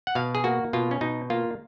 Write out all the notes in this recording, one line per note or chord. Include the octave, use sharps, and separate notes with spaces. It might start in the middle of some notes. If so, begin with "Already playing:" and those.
F#5
B2 F5
G#4
A#3 F#4
B2 F4
C#4
B2 D#4
A#3 F4